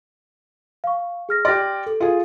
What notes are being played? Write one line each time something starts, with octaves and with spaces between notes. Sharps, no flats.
F5 C#6
G#4 F6 A#6
G4 D5 C6 F6 A#6
A4
F4 G#4